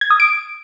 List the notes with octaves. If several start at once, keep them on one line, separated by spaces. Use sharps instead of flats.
G#6
D#6
D7